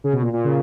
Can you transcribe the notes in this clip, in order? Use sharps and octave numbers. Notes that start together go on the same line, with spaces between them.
C#3
B2
A#2
A#2
C#3